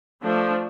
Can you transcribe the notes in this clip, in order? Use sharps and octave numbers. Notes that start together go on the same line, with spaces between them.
F3 A3 D4